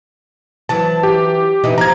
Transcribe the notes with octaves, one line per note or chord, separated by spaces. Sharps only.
E3 F#3 A5
G4
B2 E3 D#4
F3 A#5 G#6